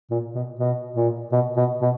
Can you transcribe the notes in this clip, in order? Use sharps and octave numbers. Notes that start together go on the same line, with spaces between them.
A#2
B2
B2
A#2
B2
B2
B2